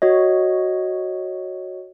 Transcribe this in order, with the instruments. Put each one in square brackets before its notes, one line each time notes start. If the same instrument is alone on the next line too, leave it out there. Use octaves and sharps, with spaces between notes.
[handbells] F#4 C#5 D#5